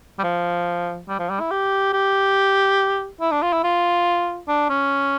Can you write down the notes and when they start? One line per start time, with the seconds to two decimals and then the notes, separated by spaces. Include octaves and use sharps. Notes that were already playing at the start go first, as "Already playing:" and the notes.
0.19 G3
0.24 F3
1.08 G3
1.19 F3
1.30 G3
1.40 E4
1.51 G4
1.93 G4
3.21 E4
3.31 D4
3.42 F4
3.53 E4
3.64 F4
4.48 D4
4.70 C#4